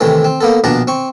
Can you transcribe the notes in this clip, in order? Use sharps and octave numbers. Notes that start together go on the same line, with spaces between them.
C3 D#3 E3 A3
C4
A#3 B3 A4
A#1 B2 D4 A5 A#5
C4 C#6